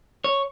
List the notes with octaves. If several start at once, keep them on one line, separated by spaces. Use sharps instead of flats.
C#5